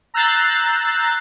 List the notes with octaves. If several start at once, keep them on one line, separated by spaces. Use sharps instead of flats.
A#5 E6 F#6 G6 A6 C7